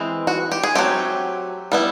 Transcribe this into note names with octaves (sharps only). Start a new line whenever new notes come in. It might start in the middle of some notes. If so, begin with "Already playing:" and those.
Already playing: E3 G#3 C4
F#4
G4
G#4
F#3 A3 C4 G4
G3 B3 E4